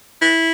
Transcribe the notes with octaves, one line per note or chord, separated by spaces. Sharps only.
E4